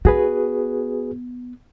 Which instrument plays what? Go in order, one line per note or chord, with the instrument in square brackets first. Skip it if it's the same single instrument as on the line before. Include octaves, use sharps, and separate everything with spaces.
[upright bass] B3 [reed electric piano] F#4 G#4 B4